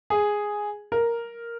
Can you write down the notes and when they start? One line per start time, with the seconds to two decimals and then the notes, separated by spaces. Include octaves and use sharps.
0.10 G#4
0.92 A#4